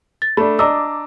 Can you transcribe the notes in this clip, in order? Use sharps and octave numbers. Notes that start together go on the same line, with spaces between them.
A6
A3 D4 B5
D4 D5 D#5 A#5 D6 E6